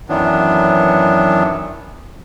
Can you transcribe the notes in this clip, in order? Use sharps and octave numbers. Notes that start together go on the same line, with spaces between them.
F#2 D#3 E3 F#3 B3 D4